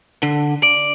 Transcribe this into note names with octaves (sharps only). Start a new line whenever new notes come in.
D3
D5